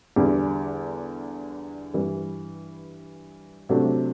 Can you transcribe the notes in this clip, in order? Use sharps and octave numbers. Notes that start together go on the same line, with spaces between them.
E2 D3 G3
G2 E3 G3
C3 F#3 A3 D4